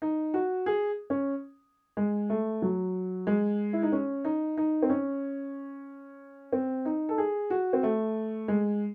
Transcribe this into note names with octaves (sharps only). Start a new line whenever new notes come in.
D#4
F#4
G#4
C#4
G#3
A3
F#3
G#3
E4
D#4
C#4
D#4
D#4
C4
C#4
C4
D#4
A4
G#4
F#4
C4
A3
G#3